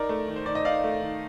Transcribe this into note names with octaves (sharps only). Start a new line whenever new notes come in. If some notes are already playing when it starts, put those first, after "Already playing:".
Already playing: D#4 A#4 D5
A3
D#3
C5
D#3 D5
D#5
D#4 D5 F5
A3
D#3